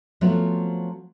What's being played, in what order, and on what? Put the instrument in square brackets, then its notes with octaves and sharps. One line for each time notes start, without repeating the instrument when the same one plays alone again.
[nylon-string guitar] F3 F#3 A3 B3 C4 F4